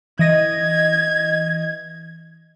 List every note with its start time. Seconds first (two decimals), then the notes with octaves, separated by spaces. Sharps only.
0.19 E3 D#5 G#6 A#6